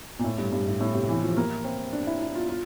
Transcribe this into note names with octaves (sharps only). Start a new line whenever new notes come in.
A#2
A2
G2
G2
A2
A2
C3
E3
F3
A#3
C4
D4
E4
E4
F4
F4